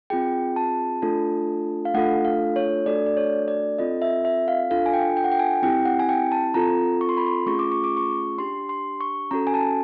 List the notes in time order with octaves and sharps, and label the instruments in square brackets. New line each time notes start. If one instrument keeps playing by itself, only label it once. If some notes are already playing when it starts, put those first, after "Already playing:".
[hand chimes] C4 F4 G#4 G5
A5
A3 D4 F4 A4
F5
A3 D4 F4 A4 F#5
F5
C#5
A3 D4 F#4 A4 D5
D5
C#5
D5
C4 F4 A4 D#5
E5
E5
F5
D4 F4 A4 F5
G#5
G5
G5
F#5
G5
G#5
C4 E4 G4 G5
F#5
G#5
G5
A5
C4 F4 A4 A#5
C#6
C6
B5
C6
A3 C#4 F4 G#4 C#6
D6
C#6
D6
C#6
D4 G4 C6
C6
C#6
C#4 F#4 A4 A#5
G#5
A5